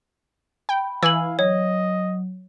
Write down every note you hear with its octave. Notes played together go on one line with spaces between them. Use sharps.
G5 B5
E3 F5 G#5 E6 F#7
F#3 C#5 D#5